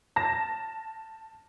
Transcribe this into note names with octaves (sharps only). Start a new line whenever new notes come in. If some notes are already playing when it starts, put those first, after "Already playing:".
A5 A#6